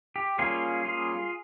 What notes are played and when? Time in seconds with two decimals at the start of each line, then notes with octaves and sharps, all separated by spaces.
0.16 G4
0.39 G3 A#3 C#4 F4 G#4
0.85 F4 G#4